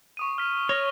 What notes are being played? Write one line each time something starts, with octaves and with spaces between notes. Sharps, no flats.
C#6 D#6 D#7
F6 B6
C#5 F6 A#6